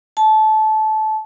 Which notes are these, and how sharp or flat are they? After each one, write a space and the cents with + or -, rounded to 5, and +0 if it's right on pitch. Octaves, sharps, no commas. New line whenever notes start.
A5 -20